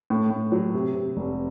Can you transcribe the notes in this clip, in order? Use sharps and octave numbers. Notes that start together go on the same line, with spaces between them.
A2
A2
F#3
C3
C3
F1